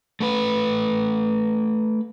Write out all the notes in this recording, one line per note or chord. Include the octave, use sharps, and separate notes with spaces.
A3 B4